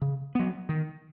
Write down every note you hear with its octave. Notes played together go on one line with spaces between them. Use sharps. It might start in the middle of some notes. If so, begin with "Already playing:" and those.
C#3
F#3 B3
D#3